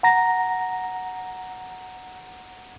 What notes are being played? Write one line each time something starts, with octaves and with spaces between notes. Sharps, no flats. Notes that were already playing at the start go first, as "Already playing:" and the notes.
F#5 A#5 A#6